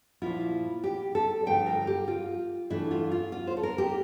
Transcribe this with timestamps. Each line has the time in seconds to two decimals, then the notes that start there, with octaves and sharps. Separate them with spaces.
0.22 A#2 F3 A#3 E4 F4
0.84 G4
1.15 A4
1.46 G2 D3 F3 A3 G5
1.66 A#4
1.87 G4
2.08 F4
2.70 G2 E3 A3 D4 E4
2.91 F4
3.12 F4
3.32 F4
3.47 C5
3.57 A4
3.63 A#4
3.78 G4